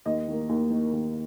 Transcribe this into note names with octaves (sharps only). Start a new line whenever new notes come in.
D#2 D#5
D#3 A#3
D#2
D#3 A#3
D#2